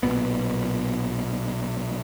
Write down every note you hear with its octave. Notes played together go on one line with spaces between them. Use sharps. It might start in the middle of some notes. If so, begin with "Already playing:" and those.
B1 E2 A#2 B3